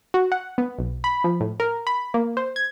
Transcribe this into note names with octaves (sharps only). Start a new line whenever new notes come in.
F#4
F#5
B3
B1
B5
F3
A2
A#4
B5
A#3
C5
G#6